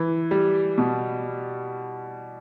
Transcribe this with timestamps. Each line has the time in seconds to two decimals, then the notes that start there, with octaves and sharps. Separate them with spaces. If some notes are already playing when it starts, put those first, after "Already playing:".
Already playing: E3
0.31 G3
0.78 B2